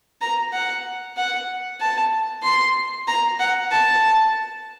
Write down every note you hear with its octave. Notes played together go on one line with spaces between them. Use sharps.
A#5
F#5
F#5
A5
C6
A#5
F#5
A5